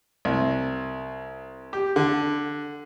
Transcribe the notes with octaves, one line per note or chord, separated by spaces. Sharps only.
C2
G4
D3